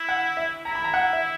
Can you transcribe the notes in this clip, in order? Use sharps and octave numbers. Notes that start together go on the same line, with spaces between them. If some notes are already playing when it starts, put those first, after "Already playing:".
Already playing: E4
F#5
E5
E4 A#5
B5
A#5
F#5
E5